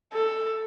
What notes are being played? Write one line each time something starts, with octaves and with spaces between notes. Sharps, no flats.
A4